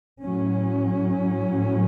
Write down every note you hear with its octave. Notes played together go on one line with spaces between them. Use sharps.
A2 F#3 C#4